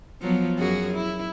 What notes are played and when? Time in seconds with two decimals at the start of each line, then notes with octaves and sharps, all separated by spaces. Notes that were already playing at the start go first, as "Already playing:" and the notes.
0.21 F3 F#3 B3
0.58 F#2 F#4 G#4
0.93 E4